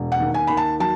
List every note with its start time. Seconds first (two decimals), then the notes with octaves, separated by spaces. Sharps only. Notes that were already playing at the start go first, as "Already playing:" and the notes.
Already playing: E1
0.12 F#5
0.19 D#2
0.34 G#5
0.47 D#2 B5
0.57 A5
0.80 F#3 A5